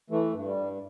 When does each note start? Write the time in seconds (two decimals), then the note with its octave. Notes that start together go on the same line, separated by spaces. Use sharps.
0.10 E3 A3
0.33 G2
0.45 G3
0.57 G2